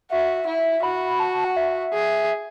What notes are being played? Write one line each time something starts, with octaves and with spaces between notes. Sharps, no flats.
F#4 E5
E4
F#4 B5
A5
A5
F#5
E5
G#4